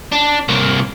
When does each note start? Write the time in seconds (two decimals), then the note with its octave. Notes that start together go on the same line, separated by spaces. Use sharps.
0.12 D4
0.49 C2 A#3